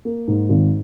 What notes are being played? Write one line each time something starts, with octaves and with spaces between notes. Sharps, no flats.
A#3
G#2
G#1